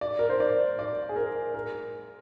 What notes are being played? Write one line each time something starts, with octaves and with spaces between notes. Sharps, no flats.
D5
A#4
C5
D5
D5
G#4
A#4
A#4